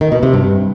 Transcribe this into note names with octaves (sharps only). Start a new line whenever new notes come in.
D#3
B2
C3
G2